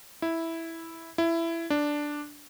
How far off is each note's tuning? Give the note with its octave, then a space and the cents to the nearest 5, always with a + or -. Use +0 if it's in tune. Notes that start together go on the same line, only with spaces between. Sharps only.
E4 -5
E4 +15
D4 +0